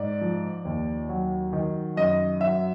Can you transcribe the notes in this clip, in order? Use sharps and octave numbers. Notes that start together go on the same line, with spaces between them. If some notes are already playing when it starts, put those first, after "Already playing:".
Already playing: G#2 D5
F3
D#2
F#3
D#3
F#2 D#5
F#3 E5